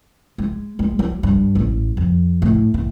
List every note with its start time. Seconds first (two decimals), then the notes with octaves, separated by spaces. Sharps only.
0.38 G#3
0.79 G#3
0.99 F#3
1.23 G2
1.55 A1
1.97 F2
2.42 A2
2.74 E3